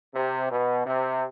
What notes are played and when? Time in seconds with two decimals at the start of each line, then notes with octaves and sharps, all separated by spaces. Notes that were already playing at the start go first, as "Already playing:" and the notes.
0.15 C3
0.51 B2
0.86 C3